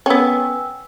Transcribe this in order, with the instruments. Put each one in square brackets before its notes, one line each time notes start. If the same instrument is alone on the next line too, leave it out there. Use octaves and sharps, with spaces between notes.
[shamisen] B3 C#4 [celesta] G5 G#5 E6